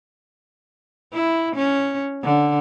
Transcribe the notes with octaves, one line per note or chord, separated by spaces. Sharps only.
E4
C#4
D3